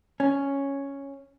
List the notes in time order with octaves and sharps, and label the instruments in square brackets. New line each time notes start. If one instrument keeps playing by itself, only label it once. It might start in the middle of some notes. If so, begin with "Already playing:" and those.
[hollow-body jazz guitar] C#4